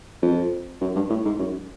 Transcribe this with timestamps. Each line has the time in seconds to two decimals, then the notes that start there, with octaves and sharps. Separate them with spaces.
0.22 F2
0.81 F#2
0.95 G2
1.10 A2
1.25 G#2
1.39 F#2